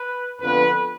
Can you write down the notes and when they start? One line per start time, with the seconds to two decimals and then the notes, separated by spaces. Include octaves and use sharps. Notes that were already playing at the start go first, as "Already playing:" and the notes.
Already playing: B4
0.41 F2 D3 F3 B3 B4